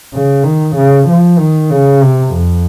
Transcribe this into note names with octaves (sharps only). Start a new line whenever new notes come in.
C#3
D#3
C#3
F3
D#3
C#3
C3
F2